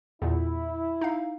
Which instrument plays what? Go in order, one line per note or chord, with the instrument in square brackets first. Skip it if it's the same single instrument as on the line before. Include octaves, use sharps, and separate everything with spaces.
[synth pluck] E2 A#2 [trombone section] E4
[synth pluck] D#4 F5